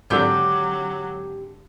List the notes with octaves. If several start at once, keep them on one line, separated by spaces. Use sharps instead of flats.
G#1 D3 F#3 G4 G6